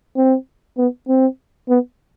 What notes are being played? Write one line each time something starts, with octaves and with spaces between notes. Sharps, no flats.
C4
B3
C4
B3